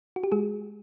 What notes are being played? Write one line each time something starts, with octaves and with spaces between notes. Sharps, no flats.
F#4
G4
G#3 F#4 G#4